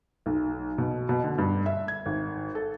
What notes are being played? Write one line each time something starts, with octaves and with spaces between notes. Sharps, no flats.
B1
B2
B2
D3
G2
E5
G#6
G#1
A4